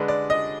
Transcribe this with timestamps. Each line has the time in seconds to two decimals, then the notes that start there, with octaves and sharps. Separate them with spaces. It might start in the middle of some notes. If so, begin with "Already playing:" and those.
Already playing: D3 G#3 D4 B4
0.08 D5
0.30 D#5